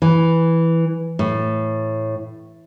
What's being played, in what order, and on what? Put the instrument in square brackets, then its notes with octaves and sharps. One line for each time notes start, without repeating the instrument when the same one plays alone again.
[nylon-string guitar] E3
A2